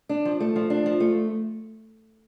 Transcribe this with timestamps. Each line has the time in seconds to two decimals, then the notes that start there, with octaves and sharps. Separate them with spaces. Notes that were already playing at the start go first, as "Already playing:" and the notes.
0.09 D4
0.25 F3
0.40 A3
0.56 F3
0.70 D4
0.86 F3
1.00 A3